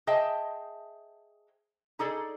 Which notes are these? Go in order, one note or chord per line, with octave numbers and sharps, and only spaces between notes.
G#4 C5 D#5 E5 G5 A5
D#4 G#4 A4 D5